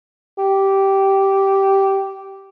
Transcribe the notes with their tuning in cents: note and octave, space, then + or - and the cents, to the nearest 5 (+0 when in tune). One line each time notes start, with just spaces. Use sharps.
G4 -10